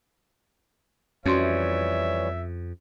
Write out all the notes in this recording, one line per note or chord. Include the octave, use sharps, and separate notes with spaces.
F2 E3 G3 C#4 F#4 C#5 E5 C6